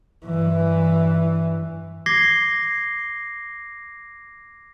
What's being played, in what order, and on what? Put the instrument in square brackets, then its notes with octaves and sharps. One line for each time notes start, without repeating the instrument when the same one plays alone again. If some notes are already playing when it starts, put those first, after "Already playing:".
[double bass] G2 E3
[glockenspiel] D6 G#6 A#6 C7 G7